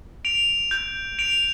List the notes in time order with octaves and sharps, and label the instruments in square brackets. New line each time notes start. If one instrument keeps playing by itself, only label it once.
[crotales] D7 F7
G6
D7 F7